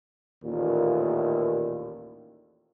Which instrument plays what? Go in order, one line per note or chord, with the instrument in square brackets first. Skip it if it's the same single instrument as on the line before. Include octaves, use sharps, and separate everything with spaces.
[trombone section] A1 D#2 A#2